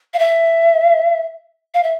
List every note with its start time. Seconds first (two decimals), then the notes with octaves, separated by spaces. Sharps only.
0.14 F5
0.19 E5
1.74 F5
1.83 E5